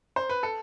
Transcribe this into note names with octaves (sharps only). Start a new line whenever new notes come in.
C5
B4
A4